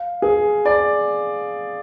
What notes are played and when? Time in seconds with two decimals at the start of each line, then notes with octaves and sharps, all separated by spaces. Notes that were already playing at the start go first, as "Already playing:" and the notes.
Already playing: F5
0.22 G#4
0.66 D5